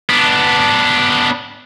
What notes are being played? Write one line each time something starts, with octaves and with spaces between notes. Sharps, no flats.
B3 D4